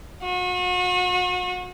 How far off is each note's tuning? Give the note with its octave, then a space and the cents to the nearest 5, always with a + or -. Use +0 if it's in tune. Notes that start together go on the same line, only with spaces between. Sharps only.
F#4 -40